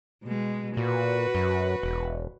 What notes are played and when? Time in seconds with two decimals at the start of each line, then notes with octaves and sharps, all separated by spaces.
0.23 B2 G#3
0.77 A#2 F#4 B4
1.35 F#2
1.83 E1